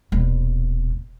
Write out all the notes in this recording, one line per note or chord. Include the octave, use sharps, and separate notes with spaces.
D#1 B2